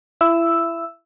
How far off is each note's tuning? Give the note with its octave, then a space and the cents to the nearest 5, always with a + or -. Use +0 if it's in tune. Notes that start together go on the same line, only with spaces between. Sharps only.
E4 +25 E6 +0